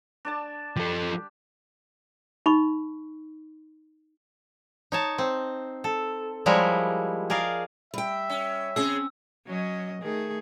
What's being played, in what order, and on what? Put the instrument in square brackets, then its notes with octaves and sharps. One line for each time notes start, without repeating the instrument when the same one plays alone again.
[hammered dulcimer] D4 D5 A5
[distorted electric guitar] F3 A4 [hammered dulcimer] G4
[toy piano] D#4 B5 C#6
[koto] D#4 C#5 A5
C4
A4
F3 G3 G#3 E4 A#4 C#5
G#4 A#4 D5 F5
[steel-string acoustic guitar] G3 G5 [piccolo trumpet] E5
[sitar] C#4
[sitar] C#3 G#4 [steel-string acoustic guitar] C4 C#4 [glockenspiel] E6
[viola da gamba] F#3 C#4 D#5
D#3 A3 G#4